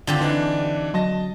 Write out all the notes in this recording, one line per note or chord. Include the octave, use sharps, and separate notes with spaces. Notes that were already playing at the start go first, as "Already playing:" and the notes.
D3 C4 F4 G4
E3 D4 D#4
F#3 D#5 A5 A#6